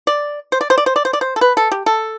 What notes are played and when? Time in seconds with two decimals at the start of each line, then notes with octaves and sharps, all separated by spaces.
0.07 D5
0.52 C5
0.61 D5
0.70 C5
0.78 D5
0.86 C5
0.96 D5
1.05 C5
1.13 D5
1.21 C5
1.36 A4
1.41 B4
1.57 A4
1.72 G4
1.86 A4